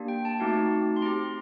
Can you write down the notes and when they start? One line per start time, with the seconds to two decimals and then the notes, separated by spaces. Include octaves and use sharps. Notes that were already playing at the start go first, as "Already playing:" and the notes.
Already playing: A#3 D4 G4
0.08 G5
0.25 A5
0.40 A3 C4 D#4 F#4
0.96 C6
1.02 C4 G4 A#5